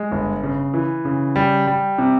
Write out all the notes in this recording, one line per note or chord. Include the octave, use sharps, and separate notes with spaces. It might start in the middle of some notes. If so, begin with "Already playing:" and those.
Already playing: G#3
G1
C#3
E3
C#3
G3
G3
C3